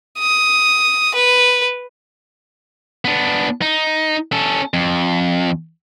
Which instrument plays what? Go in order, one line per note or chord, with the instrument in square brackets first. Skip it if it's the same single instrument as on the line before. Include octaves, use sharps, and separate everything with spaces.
[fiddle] D#6
B4
[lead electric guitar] B3 D4
D#4
C#4 A4
F2